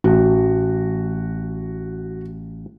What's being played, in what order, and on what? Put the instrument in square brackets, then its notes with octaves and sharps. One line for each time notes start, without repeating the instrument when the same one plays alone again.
[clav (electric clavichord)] A1 [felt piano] F#4